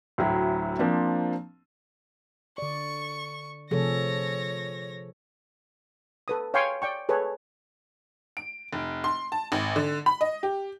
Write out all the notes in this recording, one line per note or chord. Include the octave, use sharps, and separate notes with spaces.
D2 A2 F#3 E4
F3 A#3 C4 D4
D3 D5 C#6
C3 F3 A3 G#4 A4 C#5 A#6
A4 B4 D#6
C#5 F5 G5 G#5 C6 C#6
D5 G5 C#6
G#4 A4 B4 C#5
D7
F1
C6
A5
G#1
D3
B5
D#5
G4